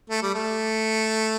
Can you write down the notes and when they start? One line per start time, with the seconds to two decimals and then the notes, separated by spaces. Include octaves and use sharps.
0.10 A3
0.22 G3
0.35 A3